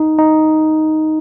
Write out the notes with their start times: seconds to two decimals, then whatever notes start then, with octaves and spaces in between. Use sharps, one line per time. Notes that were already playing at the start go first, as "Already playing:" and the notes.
Already playing: D#4
0.18 D#4